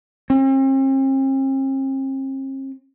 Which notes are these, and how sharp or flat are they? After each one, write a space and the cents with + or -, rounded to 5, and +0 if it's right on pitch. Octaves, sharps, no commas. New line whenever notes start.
C4 +45